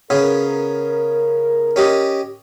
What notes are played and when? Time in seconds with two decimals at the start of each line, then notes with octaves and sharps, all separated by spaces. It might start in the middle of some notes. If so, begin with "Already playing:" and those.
0.10 C#3 B3 C#4 A#4
1.76 C#4 G4 D#5